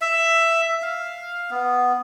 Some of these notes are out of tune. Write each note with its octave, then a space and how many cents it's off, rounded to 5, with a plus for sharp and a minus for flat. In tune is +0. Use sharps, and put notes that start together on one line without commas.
E5 +10
F5 +5
B3 +0